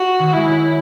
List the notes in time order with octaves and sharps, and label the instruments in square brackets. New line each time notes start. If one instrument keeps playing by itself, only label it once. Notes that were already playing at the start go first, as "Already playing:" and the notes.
Already playing: [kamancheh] F#4
[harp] D#3
[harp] G#3 [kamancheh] E4
[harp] F#3